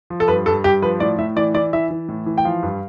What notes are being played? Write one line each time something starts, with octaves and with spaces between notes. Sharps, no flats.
F3
A4
G2 B4
G2 A4
G2 G4
F3 B4
A2 D5
A2 E5
E3 D5
E3 D5
E3 E5
E3
A2
E3
G5
F3 F5
G2